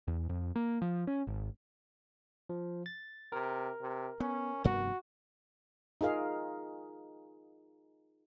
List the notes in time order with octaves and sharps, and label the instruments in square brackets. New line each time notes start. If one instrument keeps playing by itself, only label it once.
[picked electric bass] E2
F2
A#3
F3
C#4
G#1
[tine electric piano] F3
A6
[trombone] C3 [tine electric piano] A#4
[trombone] C3
[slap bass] B3 [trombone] C#4
[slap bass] F1 G2 B3 [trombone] F#4
[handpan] D#4 F4 G#4 A#4 F5